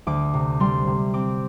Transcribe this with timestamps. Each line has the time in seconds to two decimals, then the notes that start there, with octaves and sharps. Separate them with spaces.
0.07 D2 D6
0.34 C3
0.60 G3 C6
0.87 C3
1.14 C4 D6